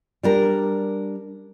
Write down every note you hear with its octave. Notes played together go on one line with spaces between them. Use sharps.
G3 D4 A#4